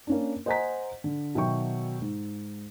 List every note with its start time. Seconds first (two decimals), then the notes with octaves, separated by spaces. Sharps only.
0.07 A#3 C#4 D4
0.46 C5 D#5 F#5 G#5 A#5 B6
1.04 D3
1.35 B2 D#3 F#3 E5 G5 C#6
2.01 G#2